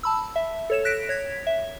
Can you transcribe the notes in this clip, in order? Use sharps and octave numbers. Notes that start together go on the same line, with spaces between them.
A5 B5 E6
E5
A4 C#5 E7
F#6 A#6 B6 D7
C#5 G#6 B6
E5